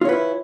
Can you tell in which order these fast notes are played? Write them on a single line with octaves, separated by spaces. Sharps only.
F4 C#5 B4 E4